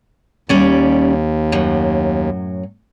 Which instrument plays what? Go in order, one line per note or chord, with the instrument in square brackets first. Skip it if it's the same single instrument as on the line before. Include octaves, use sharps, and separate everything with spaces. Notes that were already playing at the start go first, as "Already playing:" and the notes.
[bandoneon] D#2 [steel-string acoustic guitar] G3 C#4 D5
[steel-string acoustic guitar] F#2 A2 F#3